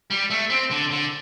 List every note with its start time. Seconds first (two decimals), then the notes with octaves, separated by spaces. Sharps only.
0.11 G3
0.30 A3
0.50 C4
0.70 D3
0.90 D3